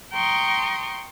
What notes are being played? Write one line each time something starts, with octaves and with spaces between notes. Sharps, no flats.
G5 A#5 C6 C#6 D#6